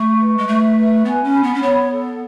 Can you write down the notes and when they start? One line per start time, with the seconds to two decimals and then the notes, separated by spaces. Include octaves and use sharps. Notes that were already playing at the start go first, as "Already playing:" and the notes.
Already playing: A3 C#6
0.19 B4
0.38 G#3
0.48 A3 E5
0.77 B4
1.05 B3 G#5
1.24 C#4
1.34 B5
1.43 B3
1.55 C#4
1.62 B3 C#5
1.91 A4